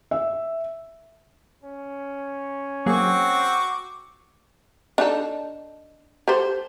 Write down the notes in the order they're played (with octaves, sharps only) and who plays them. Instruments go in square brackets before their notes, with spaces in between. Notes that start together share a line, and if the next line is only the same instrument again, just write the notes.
[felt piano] E5
[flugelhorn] C#4
[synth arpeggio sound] F#3 A#3 G#4 [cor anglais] C4 [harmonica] F#4 C#6 D6
[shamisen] D4 D#4 A4
G4 A4 C5